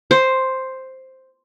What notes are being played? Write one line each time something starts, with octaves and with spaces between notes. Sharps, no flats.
C5